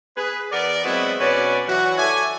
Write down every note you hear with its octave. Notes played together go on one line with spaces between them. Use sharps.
G#4 B4
E3 B3 A#4 D5
F#3 G#3 B3 C4 E4 F#4
B2 C#4 F#4 B4 D5
E3 F#3 E4 F#4
A4 C#5 D5 E5 G#5